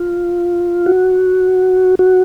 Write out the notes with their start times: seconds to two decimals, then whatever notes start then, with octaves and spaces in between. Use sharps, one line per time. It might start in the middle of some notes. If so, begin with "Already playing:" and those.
Already playing: F4
0.86 F#4
1.99 F#4